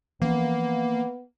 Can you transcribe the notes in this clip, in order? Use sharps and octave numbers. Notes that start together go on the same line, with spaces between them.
E3 F3 A#3 B3 C#4